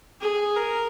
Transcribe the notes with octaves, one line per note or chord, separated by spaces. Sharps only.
G#4
A#4